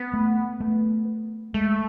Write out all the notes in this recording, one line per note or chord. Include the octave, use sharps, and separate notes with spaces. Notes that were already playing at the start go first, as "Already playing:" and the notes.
Already playing: B3
A3
A3
G#3 A3